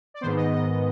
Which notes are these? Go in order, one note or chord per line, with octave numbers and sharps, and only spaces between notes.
D5
G#2 D#3 B3 C5
D#5
D#5